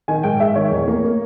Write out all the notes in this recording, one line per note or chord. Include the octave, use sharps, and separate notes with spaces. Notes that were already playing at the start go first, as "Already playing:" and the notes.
D#3 G#5
G#2 G5
G#2 E5
D#3 C#5
E2
A#3
A#3